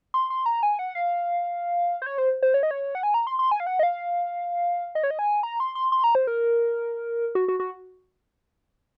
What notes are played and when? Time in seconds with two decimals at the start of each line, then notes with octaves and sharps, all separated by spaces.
0.14 C6
0.30 C6
0.46 A#5
0.63 G#5
0.79 F#5
0.95 F5
2.02 C5
2.06 C#5
2.18 C5
2.43 C5
2.54 C#5
2.63 D#5
2.71 C#5
2.95 F#5
3.03 G#5
3.14 A#5
3.27 C6
3.39 C6
3.51 G#5
3.60 F5
3.67 F#5
3.79 D#5
3.83 F5
4.95 D#5
5.03 C#5
5.11 D#5
5.19 G#5
5.43 A#5
5.60 C6
5.75 C6
5.92 C6
6.04 A#5
6.15 C5
6.27 A#4
7.35 F#4
7.48 F#4
7.60 F#4